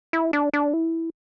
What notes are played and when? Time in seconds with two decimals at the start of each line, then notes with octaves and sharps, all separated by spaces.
0.13 E4
0.33 D4
0.53 D4
0.74 E4